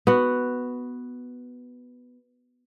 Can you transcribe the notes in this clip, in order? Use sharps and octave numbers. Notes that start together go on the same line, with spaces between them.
B3 F#4